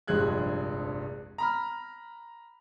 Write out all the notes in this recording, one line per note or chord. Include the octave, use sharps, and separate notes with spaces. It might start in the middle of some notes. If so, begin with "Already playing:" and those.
F1 A#1 G2 G#3 F#6 G#6
A#5 B5 F6